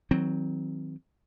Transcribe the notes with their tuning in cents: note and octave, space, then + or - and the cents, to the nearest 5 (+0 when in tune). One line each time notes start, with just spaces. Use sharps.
D#3 +40 F#3 +0 C4 +0